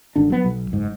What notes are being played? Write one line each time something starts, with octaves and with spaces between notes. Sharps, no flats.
G#1 D3 D4
F#3 B3
B1
F#1 G#2